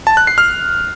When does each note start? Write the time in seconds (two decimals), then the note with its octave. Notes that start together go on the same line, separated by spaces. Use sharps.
0.07 A5
0.17 F#6
0.27 C7
0.38 F6